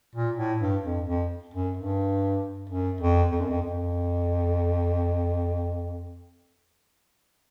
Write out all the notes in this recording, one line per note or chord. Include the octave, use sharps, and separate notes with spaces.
A#2
A2
G2
F2
F2
F#2
G2
F#2
F2
F2
F#2
F2
F2